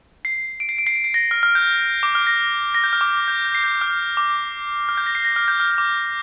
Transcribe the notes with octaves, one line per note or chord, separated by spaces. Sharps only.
C7
D7
C7
D7
C7
D7
C7
A#6
F6
F6
G6
D6
F6
A#6
A#6
G6
F6
D6
G6
G6
C7
G6
F6
D6
F6
G6
A#6
C7
A#6
F6
G6
F6
D6